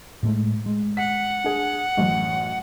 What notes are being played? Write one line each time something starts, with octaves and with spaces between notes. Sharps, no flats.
A2 G#3 A3
G#3
F#5 B6
D4 G#4
A1 F#2